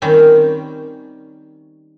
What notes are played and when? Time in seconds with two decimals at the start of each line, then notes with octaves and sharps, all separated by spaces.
0.02 D#3 G3 C4 C#4